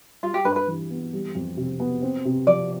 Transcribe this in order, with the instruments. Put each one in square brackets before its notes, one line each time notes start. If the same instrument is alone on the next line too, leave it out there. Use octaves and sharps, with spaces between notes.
[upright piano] G3 [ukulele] F4
[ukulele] G4
[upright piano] G2 [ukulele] B4
[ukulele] B4
[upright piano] E3
B3
G3
F2
C3
B3
C4
C3
[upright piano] F3 [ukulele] D5